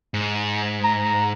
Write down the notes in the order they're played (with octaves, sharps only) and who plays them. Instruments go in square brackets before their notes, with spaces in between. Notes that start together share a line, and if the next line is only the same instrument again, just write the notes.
[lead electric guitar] G#2
[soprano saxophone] A#5